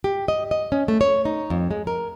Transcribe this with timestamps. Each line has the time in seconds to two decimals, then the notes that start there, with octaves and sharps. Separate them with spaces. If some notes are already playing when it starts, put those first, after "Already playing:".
0.04 G4
0.28 D#5
0.51 D#5
0.72 C#4
0.88 A3
1.01 C#5
1.25 D#4
1.50 F2
1.71 G#3
1.87 A#4